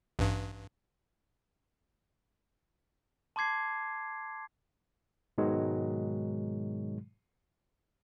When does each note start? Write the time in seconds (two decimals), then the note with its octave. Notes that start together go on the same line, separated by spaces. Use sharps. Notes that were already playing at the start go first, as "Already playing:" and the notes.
0.19 A1 G2
3.36 A5 C6 D6 G#6 C7
5.38 G#2 B2 D#3 F#3 G#3